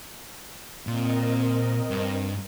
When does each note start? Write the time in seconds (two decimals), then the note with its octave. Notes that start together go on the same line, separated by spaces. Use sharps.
0.87 A#2 C4 A#4 D#5
1.90 G2